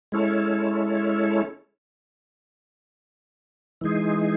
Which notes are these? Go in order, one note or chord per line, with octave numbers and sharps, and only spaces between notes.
G#3 C#4 E4 A4 C#5
E3 G#3 D#4 G#4